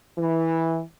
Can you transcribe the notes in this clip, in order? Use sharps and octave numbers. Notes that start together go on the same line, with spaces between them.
E3